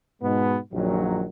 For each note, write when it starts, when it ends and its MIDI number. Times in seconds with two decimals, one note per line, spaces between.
0.21 0.56 44
0.21 0.56 47
0.21 0.56 56
0.21 0.56 59
0.73 1.25 34
0.73 1.25 42
0.73 1.25 46
0.73 1.25 51
0.73 1.25 54